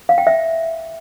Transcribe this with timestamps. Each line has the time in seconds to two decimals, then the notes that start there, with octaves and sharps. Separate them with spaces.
0.09 F5
0.18 G5
0.27 E5